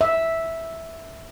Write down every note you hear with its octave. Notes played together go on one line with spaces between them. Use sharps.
E5